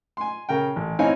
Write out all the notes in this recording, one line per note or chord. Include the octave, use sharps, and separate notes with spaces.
G#5 C6
C#3 A#4 G5
A1
C4 D#4 E4 C#5 F5 G#5